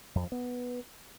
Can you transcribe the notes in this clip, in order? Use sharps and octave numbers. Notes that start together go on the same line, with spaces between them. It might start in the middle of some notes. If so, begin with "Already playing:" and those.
F2
F3
B3